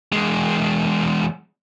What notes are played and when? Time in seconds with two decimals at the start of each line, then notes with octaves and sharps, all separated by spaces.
0.12 E2 G#3